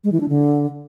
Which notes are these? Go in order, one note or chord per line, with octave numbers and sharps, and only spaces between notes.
G#3
E3
D4
D3